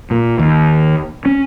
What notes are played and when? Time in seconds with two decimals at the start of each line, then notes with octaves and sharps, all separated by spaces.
0.11 A#2
0.39 D#2
1.25 C#4